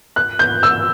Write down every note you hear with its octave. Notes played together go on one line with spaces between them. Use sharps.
F#6
G6
E6